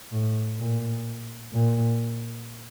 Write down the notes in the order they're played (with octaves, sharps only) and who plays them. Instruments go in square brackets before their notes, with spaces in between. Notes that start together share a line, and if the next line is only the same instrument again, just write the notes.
[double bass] A2
A#2
A#2